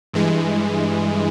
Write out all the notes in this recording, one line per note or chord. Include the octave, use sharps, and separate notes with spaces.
G2 E3 G#3